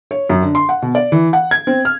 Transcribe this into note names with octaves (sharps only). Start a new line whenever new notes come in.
C#5
F#2
D3
C6
F#5
B2
D5
E3
F#5
G#6
C4
F6